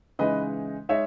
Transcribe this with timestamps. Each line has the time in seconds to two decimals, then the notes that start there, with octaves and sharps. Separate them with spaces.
0.19 C#3 E3 G#3 D#4 B4 D#5
0.89 G#3 D#4 C#5 E5